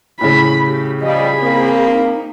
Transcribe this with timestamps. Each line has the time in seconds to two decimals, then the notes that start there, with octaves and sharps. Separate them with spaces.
0.21 A2 C#3 B5
0.66 G4
1.02 F3 G3 G#4 D#5 B5
1.41 A#3 C4
1.91 D#4